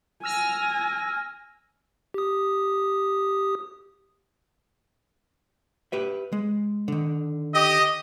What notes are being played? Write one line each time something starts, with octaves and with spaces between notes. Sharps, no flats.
G#5 E6 F6 A#6
G4 D#6
G4 B4 E5
G#3
D3 D#3
G4 D#5